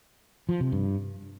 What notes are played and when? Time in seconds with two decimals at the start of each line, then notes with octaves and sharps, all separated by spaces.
0.49 F3
0.60 C3
0.72 G2